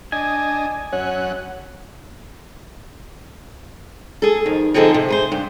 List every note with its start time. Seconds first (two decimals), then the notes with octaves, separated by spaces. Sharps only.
0.12 D4 D#5 G#5
0.93 F#2 C#4 C#5 F#5
4.22 G#4 A4
4.46 F2 D#3
4.74 D3 F3 C4 D#4 G#4 A4
4.94 C3
5.09 G#4 B4 C5
5.32 G2